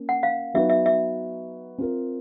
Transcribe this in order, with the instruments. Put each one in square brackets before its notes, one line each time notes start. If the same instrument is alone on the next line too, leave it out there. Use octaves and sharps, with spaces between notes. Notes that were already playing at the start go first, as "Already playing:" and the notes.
Already playing: [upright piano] A#3 C#4
[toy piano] F#5
F5
[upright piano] F#3 B3 D#4 F#4 B4 [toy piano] E5
[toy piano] E5
E5
[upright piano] C4 F4 A#4